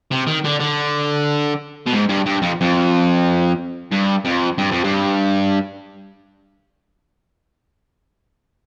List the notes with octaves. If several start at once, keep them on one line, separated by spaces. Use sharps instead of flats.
C3
D#3
D3
D3
B2
G#2
G2
G2
F2
F2
G2
F2
G2
F2
G2